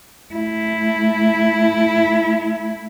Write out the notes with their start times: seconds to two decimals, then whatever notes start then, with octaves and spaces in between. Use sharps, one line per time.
0.33 A3 E4